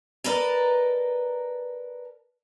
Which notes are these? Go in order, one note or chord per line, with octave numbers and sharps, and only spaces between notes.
A#4 B4 D5 D#5 A5 A#5